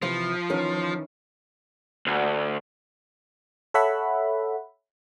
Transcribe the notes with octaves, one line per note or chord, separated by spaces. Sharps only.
C3 E3 F3
D#3 E3 C#4
D2
A4 C#5 E5 F#5 B5